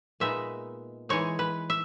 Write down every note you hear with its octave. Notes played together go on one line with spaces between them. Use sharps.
A#2 G#3 B3 D#4 E5
E3 G#3 D#4 C#5
B4
E5